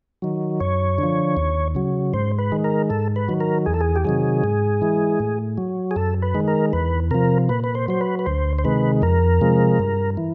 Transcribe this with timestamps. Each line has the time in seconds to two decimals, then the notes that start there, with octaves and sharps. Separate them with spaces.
0.22 D#3 F#3
0.60 F#2 C#5
0.98 D3 F3
1.37 D#2
1.75 C#3 F#3
2.14 G#2 C5
2.39 B4
2.52 D#3 G#3
2.64 A#4
2.90 G#2 A4
3.16 B4
3.28 D#3 F#3
3.40 A#4
3.66 E2 G#4
3.74 A4
3.81 G#4
3.96 G4
4.04 C3 D#3 F#3 G#4
4.44 G#2
4.82 E3 G#3
5.20 A2
5.58 F#3
5.91 G#4
5.96 F#2 A4
6.22 B4
6.34 D#3 G#3
6.48 A#4
6.73 E2 B4
7.11 C3 F3 A#4
7.49 A#2 B4
7.64 B4
7.75 C5
7.88 F#3 C5
8.01 B4
8.19 B4
8.26 D2 C5
8.59 C5
8.65 C3 D#3 G#3 B4
9.02 F2 A#4
9.41 C3 F3 G#3
9.79 G2
10.17 E3